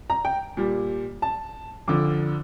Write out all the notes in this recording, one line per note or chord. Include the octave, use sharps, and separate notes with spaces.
A#5
G5
A#2 G3
A5
F2 D3 F3 D6